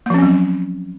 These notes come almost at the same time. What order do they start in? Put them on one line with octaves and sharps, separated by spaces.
A#3 F3 C#4 C4 F#3